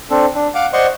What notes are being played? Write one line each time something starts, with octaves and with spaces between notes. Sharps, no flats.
C4 D4 A4
D4
F5 F#5 D6
C5 D5 D#5 F#5 C6 C#6